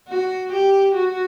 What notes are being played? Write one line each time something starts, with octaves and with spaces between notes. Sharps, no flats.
F#4
G4
F#4